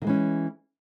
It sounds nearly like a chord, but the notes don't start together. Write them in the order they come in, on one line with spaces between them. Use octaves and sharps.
D#3 G#3 E3 C#4